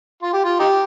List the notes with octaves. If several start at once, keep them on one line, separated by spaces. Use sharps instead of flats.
F4
G4
F4
D#4 G4